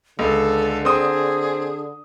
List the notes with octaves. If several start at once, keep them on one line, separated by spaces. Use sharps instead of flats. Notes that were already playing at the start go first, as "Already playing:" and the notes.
C#2 D3 A4
C4 G#4 D#6